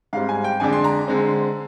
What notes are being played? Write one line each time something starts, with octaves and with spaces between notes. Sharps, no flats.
G#2 G3 C4 F5
G#5
G5
F2 D3 G#3 D4 G#5
C6
A#5
D3 G#3 C4